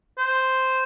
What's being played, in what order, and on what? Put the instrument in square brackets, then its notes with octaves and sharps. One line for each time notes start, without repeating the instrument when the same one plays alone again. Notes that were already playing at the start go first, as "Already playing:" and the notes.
[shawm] C5